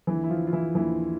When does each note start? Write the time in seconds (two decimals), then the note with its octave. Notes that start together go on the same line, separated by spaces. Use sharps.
0.07 D#2 D3 E3 F3 E4
0.24 E4
0.30 F3 F4
0.47 F4
0.53 E3 E4
0.75 D#2 D3 E3 F3 E4